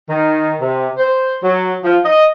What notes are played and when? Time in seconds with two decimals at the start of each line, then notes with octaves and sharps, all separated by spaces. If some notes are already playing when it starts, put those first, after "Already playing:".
0.09 D#3
0.60 C3
0.98 C5
1.42 F#3
1.84 F3
2.05 D#5